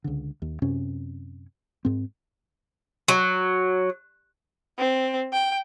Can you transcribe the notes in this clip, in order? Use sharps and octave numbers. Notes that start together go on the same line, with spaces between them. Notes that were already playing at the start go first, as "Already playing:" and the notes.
C#2 D3
D#2
F#2 C3 C#4
G#2 C4
F#3
C4
G5